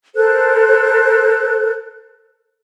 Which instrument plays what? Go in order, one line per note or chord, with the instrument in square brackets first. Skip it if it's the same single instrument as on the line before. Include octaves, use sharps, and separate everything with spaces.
[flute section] A4 A#4 C5 F#6